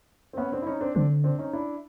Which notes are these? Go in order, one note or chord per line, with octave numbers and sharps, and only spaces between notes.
C4
B3 C#4
C4 D4
E4
C#4 D#4
C4 D4
D3 C4 D4
C4 D4
C#4 D#4
D4 E4